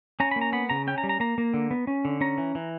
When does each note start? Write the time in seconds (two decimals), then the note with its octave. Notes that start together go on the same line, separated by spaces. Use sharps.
0.20 C#4 A#5
0.31 B5
0.36 A#3
0.41 A#5
0.53 B3 B5
0.70 C#3 A#5
0.87 C#4 G5
0.98 A#5
1.04 G3
1.09 A#5
1.20 A#3 A#5
1.38 A#3
1.54 D3
1.71 B3
1.87 C#4
2.05 D3
2.21 C#4 A#5
2.38 E3
2.55 E3